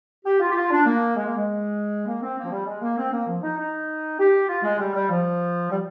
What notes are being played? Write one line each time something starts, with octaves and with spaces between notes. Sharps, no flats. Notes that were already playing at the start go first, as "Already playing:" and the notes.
G4
F4
G4
F4
D4
A#3
G#3
A#3
G#3
A#3
C4
A#3
F3
G3
G#3
A#3
C4
A#3
F3
D#4
D#4
G4
F4
G#3
G3
G3
F3
G3